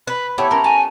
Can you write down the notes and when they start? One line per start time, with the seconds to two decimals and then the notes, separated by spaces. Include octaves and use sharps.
0.07 B4 B5
0.38 A3 B3 E4 G4 C#5
0.51 C#4 A#4 A#5
0.64 G#5 A5